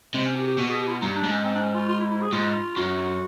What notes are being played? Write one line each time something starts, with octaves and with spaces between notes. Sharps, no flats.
C3 G#3
C#4
G4
G4
B2 F#4
G#4
G4
E4
F4
G2 D#4
D4
G#2
C#4
C4
D4
C#4
F4
F4
E4
E4
G#4
G#2 F4
F#2 F#4